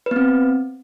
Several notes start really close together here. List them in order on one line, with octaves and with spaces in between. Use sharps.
B4 B3 C4